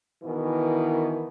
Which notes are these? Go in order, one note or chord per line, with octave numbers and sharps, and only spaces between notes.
B2 D#3 E3